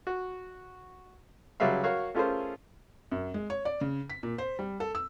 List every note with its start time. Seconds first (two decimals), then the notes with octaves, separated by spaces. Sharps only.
0.07 F#4
1.60 C#2 F#3 G3 G#4 E5 F5
1.84 F#4 A#4 C#5 F5
2.15 A3 C#4 F4 G#4 A#4 C5
3.12 F#2
3.34 G#3
3.50 C#5
3.65 D5
3.81 C#3
4.10 B6
4.23 A#2
4.38 C5
4.59 G3
4.80 A4
4.95 E6